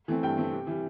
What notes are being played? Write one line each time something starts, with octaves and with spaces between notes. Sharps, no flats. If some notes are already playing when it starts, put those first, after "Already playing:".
E3 A3 C4
G2 G5
E3 A3 C4
C3
E3 G3